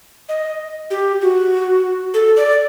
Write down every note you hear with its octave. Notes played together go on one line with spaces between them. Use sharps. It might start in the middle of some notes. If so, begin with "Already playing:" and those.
D#5
G4
F#4
A4
D5